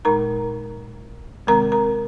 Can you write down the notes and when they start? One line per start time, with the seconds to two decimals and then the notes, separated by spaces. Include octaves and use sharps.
0.05 A#2 G#3 D#4 A#4 A#5
1.47 C3 D#3 G#3 C4 A#4 A#5
1.72 A#4 A#5